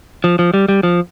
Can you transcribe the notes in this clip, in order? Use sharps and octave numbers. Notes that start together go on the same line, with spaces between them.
F3
F3
G3
G3
F3